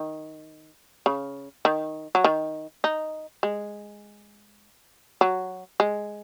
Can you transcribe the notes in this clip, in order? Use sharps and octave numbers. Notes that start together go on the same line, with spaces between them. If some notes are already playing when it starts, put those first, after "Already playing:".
Already playing: D#3
C#3
D#3
F#3
D#3
D#4
G#3
F#3
G#3